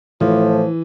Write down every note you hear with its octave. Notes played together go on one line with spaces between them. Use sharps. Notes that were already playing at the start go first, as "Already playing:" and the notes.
A2 E3 F3